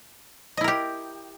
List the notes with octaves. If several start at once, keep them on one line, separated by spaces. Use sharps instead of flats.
E4 G4 A#4 D#5